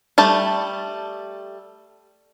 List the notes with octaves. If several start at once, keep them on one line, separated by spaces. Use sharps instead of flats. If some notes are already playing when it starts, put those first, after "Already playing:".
G3 A3 A5